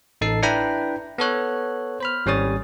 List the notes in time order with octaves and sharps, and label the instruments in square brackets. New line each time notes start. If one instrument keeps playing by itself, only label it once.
[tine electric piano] A1 D#4 A4 A5 C7
D4 E4 B4 G5 A#5 B5
B3 A4 C#5 F#6
C5 B5 F6
G#1 G3 C#4 C#5 D#6 A6